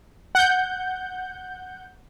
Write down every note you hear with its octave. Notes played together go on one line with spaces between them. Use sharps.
F#5 G6